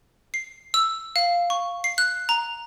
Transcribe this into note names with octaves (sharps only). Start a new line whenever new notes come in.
C7
E6
F5
C#6
C7
F#6
A#5